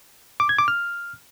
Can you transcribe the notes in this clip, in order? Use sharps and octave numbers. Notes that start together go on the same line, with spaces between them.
D6
G#6
D6
F6